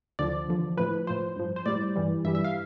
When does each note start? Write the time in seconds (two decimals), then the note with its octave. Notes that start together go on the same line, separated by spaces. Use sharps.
0.19 D2 D3 F3 D5
0.48 E2 D3 F3
0.77 A2 F3 B4
1.07 A2 F3 C5
1.36 G2 F3
1.56 C5
1.66 A2 G3 D5
1.96 G2 E3 G3
2.25 G2 E3 G3 E5
2.35 E5
2.45 F5